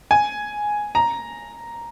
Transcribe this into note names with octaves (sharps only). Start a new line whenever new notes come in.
G#5
A#5